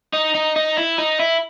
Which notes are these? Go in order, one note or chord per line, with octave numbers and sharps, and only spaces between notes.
D#4
D#4
D#4
E4
D#4
E4